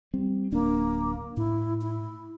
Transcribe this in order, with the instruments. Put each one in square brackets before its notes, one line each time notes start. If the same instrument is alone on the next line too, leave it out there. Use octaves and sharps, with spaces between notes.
[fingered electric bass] G3 C4
[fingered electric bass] D1 D4 [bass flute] A#3
[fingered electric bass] A2 [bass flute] E4
[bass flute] E4